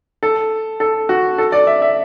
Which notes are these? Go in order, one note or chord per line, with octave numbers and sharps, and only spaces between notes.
A4
A4
F#4
A4
D5
E5
E5